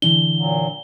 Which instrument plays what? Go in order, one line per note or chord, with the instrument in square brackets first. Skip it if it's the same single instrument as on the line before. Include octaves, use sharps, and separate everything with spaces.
[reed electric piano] D3 E3 D4 [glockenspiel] G7
[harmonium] A#2 F#3